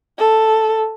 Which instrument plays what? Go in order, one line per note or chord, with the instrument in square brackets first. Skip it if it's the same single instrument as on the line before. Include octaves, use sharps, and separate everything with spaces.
[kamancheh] A4